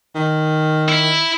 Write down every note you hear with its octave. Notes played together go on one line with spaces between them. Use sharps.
D#3
E4